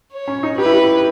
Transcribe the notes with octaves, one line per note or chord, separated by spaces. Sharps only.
C#5
C#4
D#4
G4 B4
E4
G4